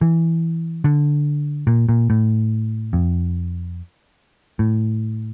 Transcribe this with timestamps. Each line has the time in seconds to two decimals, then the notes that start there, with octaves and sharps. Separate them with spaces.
0.01 E3
0.84 D3
1.67 A#2
1.89 A#2
2.10 A2
2.93 F2
4.59 A2